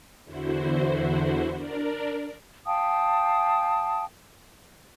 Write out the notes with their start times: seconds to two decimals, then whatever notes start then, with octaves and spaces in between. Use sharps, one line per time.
0.24 E2 D3 E4 F#4 C5
1.53 D4 A#4 D5
2.66 F5 G5 A5 D#6